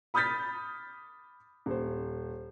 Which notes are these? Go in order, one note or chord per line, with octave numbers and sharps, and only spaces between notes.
B5 D#6 F6 G6 A6 B6
D#1 C5